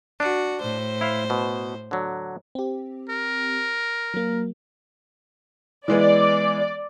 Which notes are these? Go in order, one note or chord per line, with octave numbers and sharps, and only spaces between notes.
D4 F#4
A2 C5
E4 F5
B2
D3 F#3
C4 G4
A#4
F#3 A#3
E3 G#3 B3 D5